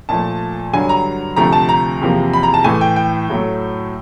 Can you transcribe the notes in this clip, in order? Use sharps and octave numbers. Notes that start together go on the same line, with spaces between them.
A#2 F3 A3 A5
G2 D3 F#3 G#5
A#5
D2 C3 F3 A3 A#5
A5
A#5
E2 C3 F3 A#3
B5
A#5
A5
A2 E3 A3 G#5
G5
G5
A2 F#3 A3